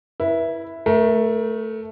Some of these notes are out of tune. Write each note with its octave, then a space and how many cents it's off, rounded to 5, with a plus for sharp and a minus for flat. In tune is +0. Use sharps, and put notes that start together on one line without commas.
E4 +0 B4 -35
A3 +0 A#4 +30